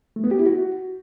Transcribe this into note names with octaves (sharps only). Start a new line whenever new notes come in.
A3
B3
G4
E4
F#4